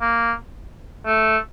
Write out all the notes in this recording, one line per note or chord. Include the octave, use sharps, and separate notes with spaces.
A#3
A3